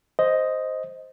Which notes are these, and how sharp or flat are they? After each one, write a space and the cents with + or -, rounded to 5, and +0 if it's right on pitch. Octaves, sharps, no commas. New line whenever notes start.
C5 +0 D#5 +0